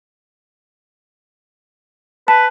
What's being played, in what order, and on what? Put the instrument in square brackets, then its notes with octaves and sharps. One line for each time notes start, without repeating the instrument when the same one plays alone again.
[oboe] B4 [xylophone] A5